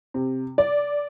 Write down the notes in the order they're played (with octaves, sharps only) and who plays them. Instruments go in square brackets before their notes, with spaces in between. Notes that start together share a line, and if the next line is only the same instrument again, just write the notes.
[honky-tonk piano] C3
D5